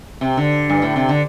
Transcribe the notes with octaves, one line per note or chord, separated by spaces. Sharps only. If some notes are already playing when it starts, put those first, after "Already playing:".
C3
D3
G2
A2
C3
D3